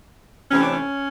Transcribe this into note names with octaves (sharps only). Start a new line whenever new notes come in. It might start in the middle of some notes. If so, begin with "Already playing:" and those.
C3 E3 A3 C4 C#4
D4
C#4